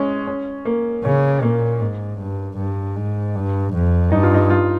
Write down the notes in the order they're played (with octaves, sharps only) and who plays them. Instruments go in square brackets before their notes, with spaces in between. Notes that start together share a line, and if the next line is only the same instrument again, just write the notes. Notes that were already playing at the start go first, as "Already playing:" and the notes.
Already playing: [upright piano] G#3 C#4
C#4
A#3
[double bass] C#3 [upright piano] C#4
[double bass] A#2 [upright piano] A#3
[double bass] G#2
G2
G2
G#2
G2
F2
[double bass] G2 [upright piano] D#4
[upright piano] F4
D#4
F4